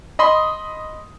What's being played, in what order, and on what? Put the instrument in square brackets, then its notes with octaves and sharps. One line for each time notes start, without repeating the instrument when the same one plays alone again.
[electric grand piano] D#5 B5 C6 D#6